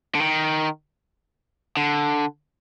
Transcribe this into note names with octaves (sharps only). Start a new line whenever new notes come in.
D3
D#3
D3